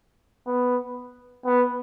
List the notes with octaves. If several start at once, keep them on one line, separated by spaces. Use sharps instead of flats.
B3
B3